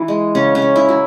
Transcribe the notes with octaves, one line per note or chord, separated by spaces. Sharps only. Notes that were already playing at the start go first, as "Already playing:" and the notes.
Already playing: E3
G#3
C#3 C#4
C#4
C#3
E4
F#3